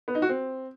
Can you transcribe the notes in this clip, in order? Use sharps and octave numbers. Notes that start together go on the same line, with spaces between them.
B3
D#4
F#4
C4